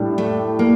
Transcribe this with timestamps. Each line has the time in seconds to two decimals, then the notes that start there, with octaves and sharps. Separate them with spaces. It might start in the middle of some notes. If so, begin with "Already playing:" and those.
Already playing: A2 G3 D4
0.18 A3
0.59 A#3